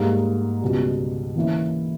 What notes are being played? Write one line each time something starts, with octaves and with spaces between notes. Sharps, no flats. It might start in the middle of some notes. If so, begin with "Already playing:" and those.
Already playing: G#2 G3 A#3
C#2 B2 G3
E3 A#3 C#4 E4